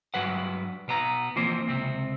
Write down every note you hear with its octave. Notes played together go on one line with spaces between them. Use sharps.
G2 F#3 B4 F#5
B2 B3 A#5
E3 F3 A#3 C4
C#2 C3 C4